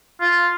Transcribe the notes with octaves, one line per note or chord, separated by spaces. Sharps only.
F4